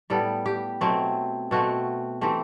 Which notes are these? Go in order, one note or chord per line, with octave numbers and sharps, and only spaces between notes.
A2 G3 B3 A4
G4
B2 F#3 A3 C4
B2 A3 C4 F#4
E3 A3 C4 G4